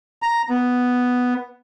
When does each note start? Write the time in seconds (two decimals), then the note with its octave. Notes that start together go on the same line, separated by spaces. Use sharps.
0.22 A#5
0.50 B3